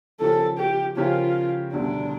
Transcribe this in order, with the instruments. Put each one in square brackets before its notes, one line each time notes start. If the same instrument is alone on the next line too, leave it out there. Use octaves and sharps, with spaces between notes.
[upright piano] C#3 F3 C#4 G4 A#4 [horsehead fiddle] A4
[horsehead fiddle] G4
[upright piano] C#3 F3 C#4 G4 A#4 [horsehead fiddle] F4
[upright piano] E1 D2 D3 G3 [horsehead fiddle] D4